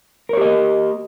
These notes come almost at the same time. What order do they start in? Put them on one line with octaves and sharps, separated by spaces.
A#4 C#5 G4 D#5 A#3